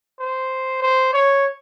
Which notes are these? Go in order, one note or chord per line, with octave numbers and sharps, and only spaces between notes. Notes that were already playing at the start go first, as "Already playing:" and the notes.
C5
C5
C#5